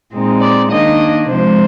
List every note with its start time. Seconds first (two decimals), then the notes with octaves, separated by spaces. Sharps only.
0.12 A#2 G#3 C4 D#4
0.41 D5
0.71 D#3 A#3 D4 D#5
1.29 C3 F3 G#3 C5